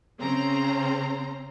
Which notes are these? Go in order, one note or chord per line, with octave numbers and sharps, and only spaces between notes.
C#3 C4 C#4 A#5 C6